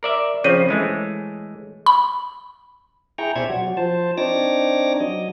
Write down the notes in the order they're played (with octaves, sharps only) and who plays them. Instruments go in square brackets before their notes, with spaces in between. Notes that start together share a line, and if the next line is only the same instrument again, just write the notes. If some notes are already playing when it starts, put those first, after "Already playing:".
[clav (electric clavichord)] A#4 D5 E5
[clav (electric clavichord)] C#3 F3 C4 [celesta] C#5 D#7
[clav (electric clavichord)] E3 G#3 A3
[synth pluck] B5
[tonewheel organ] E4 G#4 G5 A#5 C#6
B2 C5 D5 E5 C#6 G#6
F#3 F#4
F3 C5 A5
C4 D4 D#4 C#5 D6 A#6
F#3 D#5